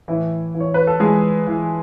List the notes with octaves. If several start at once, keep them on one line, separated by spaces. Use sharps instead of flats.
A2 E3 E4
E3
C#5
B4
A4
E3 G#3 G#4
E3